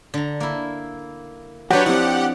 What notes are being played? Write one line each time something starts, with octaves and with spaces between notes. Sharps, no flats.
D3 A#5
A#3 E4
F#3 D4 F#4 G4 B4 C#5 F#5
F3 C4 E4 G4 F#5